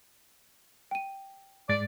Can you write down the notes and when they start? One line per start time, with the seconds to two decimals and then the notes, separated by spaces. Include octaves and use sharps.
0.91 G5 D#7
1.69 G#2 G#3 D5 A6